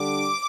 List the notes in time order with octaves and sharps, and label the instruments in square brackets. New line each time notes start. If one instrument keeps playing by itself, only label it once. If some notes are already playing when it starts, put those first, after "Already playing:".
Already playing: [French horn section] D3 G3 D4 [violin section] D6